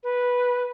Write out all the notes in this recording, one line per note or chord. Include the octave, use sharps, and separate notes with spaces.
B4